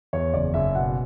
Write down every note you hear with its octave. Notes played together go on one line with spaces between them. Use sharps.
E2 C#5
F#1 D5
F#1 E5
B2 F#5